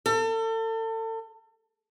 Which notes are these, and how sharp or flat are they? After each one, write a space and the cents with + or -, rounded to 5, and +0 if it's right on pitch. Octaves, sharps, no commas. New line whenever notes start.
A4 +35